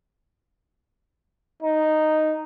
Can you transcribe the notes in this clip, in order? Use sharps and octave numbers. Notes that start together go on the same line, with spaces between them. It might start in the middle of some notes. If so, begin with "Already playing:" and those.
D#4